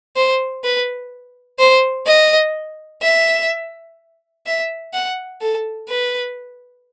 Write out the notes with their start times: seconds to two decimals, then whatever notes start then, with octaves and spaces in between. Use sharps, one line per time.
0.16 C5
0.64 B4
1.59 C5
2.07 D#5
3.02 E5
4.46 E5
4.94 F#5
5.41 A4
5.89 B4